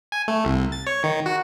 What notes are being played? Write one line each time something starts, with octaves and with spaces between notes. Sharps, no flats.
G#5
A3
C2
A6
C#5
D#3
F#4